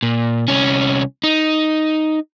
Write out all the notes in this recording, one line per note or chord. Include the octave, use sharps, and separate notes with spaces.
A#2
C2 C#4
D#4